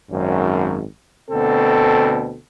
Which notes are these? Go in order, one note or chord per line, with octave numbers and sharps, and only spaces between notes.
G#1 F#2
D2 B2 C4 A4